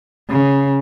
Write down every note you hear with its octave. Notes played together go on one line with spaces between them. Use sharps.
C#3